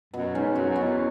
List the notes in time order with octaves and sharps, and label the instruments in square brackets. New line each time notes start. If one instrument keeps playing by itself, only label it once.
[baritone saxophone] F#2 [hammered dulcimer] B2
[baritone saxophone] G#2 [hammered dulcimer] C#4
[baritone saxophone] F#2 [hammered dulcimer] F#4
[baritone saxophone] F#2
[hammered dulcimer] B2
[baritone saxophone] E2